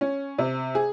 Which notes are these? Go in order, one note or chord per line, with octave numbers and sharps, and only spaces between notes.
C#4
C3
G#4